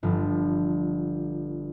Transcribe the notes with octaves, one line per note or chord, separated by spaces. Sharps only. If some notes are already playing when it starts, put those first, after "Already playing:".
G1 F3